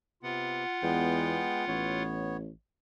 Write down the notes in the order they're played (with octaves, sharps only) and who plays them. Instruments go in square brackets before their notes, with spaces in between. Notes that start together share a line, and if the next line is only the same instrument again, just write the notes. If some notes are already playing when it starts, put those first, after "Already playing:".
[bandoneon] C3 B3 [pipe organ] F4 F#5
[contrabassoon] E2 [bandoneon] G#3 B3 G5
[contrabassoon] A1 [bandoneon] B3 C#5